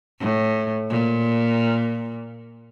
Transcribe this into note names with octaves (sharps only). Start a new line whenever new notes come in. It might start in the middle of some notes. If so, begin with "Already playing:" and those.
A2
A#2